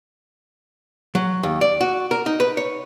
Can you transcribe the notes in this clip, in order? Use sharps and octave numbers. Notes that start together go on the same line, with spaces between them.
F#3
D#2
D5
F#4
A#4
D#4
B4
C#5